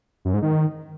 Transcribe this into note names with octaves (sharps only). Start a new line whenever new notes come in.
F#2
G#2
D#3